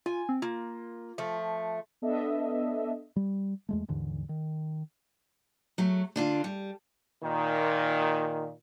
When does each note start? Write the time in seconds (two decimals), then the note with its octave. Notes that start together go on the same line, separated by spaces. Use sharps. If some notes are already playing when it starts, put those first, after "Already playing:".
0.06 F4 G#5
0.29 C4
0.42 A#3 F4
1.18 F3 A3
2.02 B3 D4 A4 D#5 E5
3.16 G3
3.69 E2 G#3 A3
3.88 D#2 G#2 D3 E3
4.29 D#3
5.78 F#3 A3
6.16 D3 D4 F4
6.44 G3
7.23 A#2 D#3